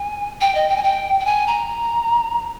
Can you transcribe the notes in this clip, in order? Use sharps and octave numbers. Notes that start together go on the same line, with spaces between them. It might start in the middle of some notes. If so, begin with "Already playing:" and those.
Already playing: G#5
G5
D#5
G5
G#5
G5
G5
G#5
A#5